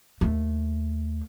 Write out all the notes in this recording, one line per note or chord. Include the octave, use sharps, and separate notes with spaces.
D#2 A3